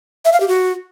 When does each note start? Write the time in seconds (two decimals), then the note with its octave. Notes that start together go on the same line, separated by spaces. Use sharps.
0.25 E5
0.33 F5
0.40 G4
0.48 F#4